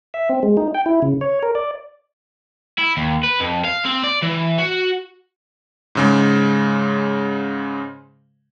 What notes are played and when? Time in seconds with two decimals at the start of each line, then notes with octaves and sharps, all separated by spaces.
0.14 E5
0.29 C4
0.43 G#3
0.57 D#4
0.74 G5
0.86 E4
1.02 C#3
1.21 C#5
1.43 A#4
1.55 D5
2.78 E4
2.97 D#2
3.24 B4
3.40 F2
3.65 F5
3.85 C4
4.03 D5
4.22 E3
4.58 F#4
5.95 G#2 C#3 G#3